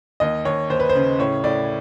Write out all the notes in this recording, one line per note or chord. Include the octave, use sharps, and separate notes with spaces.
D#2 D#5
D#2 C#5
D#2 C5
B4
C5
C#3
A2 C#5
A2 D5